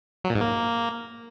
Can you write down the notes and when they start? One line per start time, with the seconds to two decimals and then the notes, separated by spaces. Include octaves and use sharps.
0.24 F#3
0.30 A#2
0.35 G#2
0.41 A#3